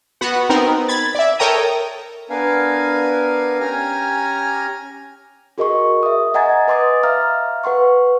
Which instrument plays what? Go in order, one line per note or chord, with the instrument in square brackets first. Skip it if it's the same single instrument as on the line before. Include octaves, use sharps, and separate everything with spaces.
[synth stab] B3 F#4 F#5
B3 C4 D#4 A#4
B5 G#6 A6
D5 E5
A4 A#4 C#5 G5 A#5 D#6
[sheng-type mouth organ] B3 D4 A#4 B4 F5 G#5
C#4 G4 G#5 A#5 F6
[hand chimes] F#4 G#4 A#4 D#5 C6 C#6
E5 D#6
D#5 F#5 G#5 A#5 G#6 A6
B4 D#5 C6 D6 D#6 A6
E5 F5 A#5 F6
B4 F#5 C6 C#6